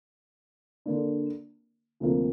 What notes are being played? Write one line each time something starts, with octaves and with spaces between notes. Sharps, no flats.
D3 A#3 D4
D2 C3 F3 A#3